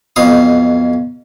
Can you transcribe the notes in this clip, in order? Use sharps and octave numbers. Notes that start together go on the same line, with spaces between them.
B1 F2 F5 D#6